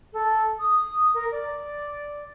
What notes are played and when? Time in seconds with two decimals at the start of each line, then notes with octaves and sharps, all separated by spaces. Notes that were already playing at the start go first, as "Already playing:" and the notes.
0.13 A4
0.59 D#6
1.14 A#4
1.32 D5